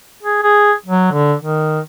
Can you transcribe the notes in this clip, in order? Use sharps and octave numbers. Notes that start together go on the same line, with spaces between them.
G#4
G#4
F#3
D3
D#3